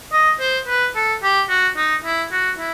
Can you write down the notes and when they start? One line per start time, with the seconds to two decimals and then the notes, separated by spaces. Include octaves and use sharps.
0.12 D#5
0.40 C5
0.68 B4
0.95 A4
1.23 G4
1.49 F#4
1.77 D#4
2.04 E4
2.32 F#4
2.58 E4